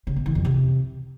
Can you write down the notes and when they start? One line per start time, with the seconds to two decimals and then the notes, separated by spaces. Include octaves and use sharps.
0.07 C#3
0.16 B2
0.26 E3
0.35 F2
0.45 C3